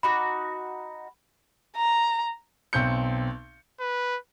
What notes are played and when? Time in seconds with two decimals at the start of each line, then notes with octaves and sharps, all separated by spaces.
0.03 D#4 F#4 B5 D6
1.77 A#5
2.73 B1 C4 G6 C#7
3.80 B4